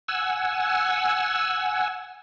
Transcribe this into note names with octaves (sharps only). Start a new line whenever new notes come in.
F#5 G#5 E6